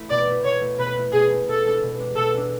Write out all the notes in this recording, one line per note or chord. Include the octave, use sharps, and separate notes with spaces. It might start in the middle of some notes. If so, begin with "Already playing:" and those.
Already playing: A3 E4
B2 D5
A3 E4
B2 C#5
A3 E4
B2 B4
A3 E4
B2 G#4
A3 E4
B2 A4
G#3 D4
B2
G#3 D4
B2 A4
G#3 D4